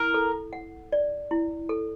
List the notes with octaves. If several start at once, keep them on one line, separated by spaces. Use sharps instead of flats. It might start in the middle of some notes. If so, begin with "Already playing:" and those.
Already playing: E4 A#4
A4
F#5
D5
E4
A4